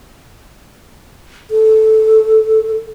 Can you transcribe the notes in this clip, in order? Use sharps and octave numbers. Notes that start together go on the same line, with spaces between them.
A4